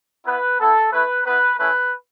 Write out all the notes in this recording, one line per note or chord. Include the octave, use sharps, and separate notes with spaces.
B3 E4 B4
B3 E4 A4
A3 E4 B4
B3 E4 B4
A3 C#4 E4 B4